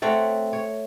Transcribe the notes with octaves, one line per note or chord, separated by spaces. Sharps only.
A3 C4 C#5 F#5
C#5